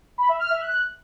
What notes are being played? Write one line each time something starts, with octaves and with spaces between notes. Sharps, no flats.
B5
E5
F6
E5
F#6